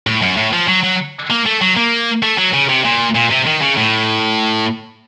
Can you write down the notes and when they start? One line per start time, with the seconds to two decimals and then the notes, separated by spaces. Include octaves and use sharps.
0.07 A2
0.22 F#2
0.37 A2
0.53 F3
0.68 F#3
0.83 F#3
1.30 A#3
1.46 A3
1.61 F#3
1.77 A#3
2.23 A3
2.38 F#3
2.53 C#3
2.70 C3
2.85 A#2
3.16 A#2
3.31 C3
3.47 D#3
3.62 C#3
3.78 A2